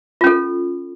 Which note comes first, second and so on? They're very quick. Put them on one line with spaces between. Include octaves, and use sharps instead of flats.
F4 C#4 A4